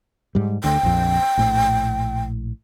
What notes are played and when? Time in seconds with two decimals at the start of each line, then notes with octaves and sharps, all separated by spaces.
0.35 G#2 G3
0.64 D2 D3 G5
0.83 A#1 F2
1.37 A#1 A2